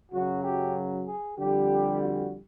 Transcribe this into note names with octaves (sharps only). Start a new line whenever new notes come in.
F#2 C#3 F#3 F#4
G4
G#4
F2 D3 G3 G4
F#4